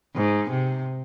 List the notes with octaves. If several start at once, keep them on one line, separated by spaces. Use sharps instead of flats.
G#2
C3